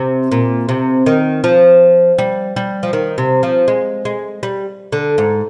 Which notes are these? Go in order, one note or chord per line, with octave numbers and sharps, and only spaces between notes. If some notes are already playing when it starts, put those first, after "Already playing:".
Already playing: C3
A#2
C3
D#3
F3
G3
G3
F3
D#3
C3
F3
G#3
G#3
G3
D3
G#2